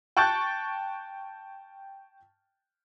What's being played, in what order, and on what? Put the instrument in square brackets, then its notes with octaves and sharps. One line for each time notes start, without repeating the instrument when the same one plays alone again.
[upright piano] G5 A5 C#6 F#6 G6 A6